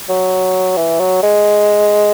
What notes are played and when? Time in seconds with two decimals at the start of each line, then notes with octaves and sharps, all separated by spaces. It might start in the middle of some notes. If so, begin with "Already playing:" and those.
0.09 F#3
0.77 E3
1.00 F#3
1.23 G#3